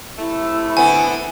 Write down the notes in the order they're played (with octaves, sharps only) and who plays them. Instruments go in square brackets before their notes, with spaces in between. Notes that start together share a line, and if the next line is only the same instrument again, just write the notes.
[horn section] C3 A3 [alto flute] E4
[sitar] D3 B3 [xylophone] G#5